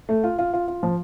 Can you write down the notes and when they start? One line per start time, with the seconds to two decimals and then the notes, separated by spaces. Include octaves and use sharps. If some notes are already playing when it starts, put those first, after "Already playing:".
0.09 A3
0.24 F4
0.39 F4
0.53 F4
0.68 F4
0.83 F3